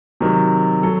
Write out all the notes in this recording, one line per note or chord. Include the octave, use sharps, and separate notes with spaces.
C3 D#3 F#3
F#3 A4